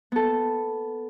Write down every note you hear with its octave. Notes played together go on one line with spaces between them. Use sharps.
B3 A4